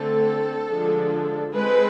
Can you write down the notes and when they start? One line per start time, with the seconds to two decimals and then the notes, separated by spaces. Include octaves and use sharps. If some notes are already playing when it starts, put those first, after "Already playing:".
Already playing: D3 A3 C4 A4
0.67 D3 F3 G#3 D4
1.54 G#3 C4 B4